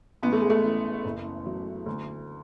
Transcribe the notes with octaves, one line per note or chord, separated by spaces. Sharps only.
A1 B3
A3
G#3
A3
A1
F#1
F#3
D2